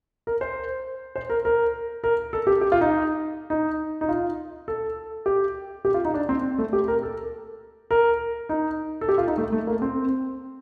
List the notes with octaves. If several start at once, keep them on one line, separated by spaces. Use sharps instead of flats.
A#4
C5
C5
A#4
A#4
A#4
A4
G4
G4
F4
D#4
D#4
D#4
F4
A4
G4
G4
F4
D#4
D4
C4
A3
G4
A#4
A4
A#4
D#4
A4
G4
F4
D#4
A3
A3
A#3
C4